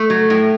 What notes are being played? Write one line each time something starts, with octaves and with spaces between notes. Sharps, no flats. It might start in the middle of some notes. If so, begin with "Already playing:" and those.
Already playing: A3
F#3
A2